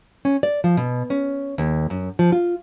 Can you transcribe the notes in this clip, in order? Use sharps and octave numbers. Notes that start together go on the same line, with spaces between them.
C#4
D5
F3
B2
C#4
D#2
F#2
F3
F4